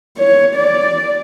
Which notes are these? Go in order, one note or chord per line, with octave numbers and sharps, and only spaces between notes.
C#5
D5